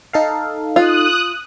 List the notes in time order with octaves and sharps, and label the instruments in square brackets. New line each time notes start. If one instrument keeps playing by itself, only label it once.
[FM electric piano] D#4 A4 F5
[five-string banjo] F4 [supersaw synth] D#6 F#6